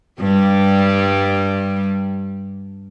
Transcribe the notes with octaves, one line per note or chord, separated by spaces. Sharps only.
G2 G3